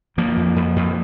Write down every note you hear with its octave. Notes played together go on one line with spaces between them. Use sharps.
F2 F3 A#3
F2
F2
F2